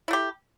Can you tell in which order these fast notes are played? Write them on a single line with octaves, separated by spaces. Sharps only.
E4 A3 G4